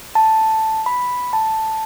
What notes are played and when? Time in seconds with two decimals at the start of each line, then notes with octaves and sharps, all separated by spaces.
0.15 A5
0.86 B5
1.33 A5